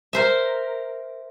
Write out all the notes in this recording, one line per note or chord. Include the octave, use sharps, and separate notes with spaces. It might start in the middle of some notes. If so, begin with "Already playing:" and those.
A#4 C5 E5